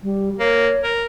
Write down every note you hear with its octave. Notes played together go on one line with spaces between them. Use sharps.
G3
A#3 C#5
A#4